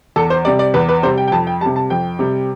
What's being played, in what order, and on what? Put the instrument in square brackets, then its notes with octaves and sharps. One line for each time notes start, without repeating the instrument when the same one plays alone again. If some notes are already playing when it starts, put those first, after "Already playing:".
[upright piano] E2 A4
C5
C3 G3 D5
D5
E2 B4
B4
C3 G3 C5
G5
G5
F2 A5
G5
C3 G3 A5
A5
F2 G5
C3 G3